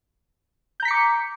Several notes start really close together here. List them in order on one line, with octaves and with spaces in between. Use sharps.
G6 A#5 B6 C#7 D6